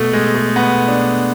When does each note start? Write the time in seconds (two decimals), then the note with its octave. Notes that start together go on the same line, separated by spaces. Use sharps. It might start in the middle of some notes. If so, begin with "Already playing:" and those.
Already playing: B2 A3
0.13 G#3
0.35 A3
0.56 B2 B3
0.88 D4